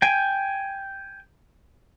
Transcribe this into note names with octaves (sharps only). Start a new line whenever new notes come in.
G5 G#5